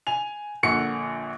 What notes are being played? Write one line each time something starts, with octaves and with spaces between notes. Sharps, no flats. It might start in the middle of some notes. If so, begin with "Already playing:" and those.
G#5 F7
A#1 A#2 D3 F#5 C#6 C#7